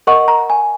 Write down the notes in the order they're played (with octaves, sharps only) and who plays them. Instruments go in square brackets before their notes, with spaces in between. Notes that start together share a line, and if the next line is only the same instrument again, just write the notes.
[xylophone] A#4 D#5 F#5 C#6
A#5
G#5